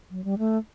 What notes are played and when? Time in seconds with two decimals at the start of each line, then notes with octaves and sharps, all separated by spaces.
0.10 F#3
0.24 G3
0.38 A3